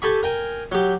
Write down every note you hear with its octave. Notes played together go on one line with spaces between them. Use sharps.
G4 A4 G#5 B5 C#6
A#4 G5 G#5
F#3 G4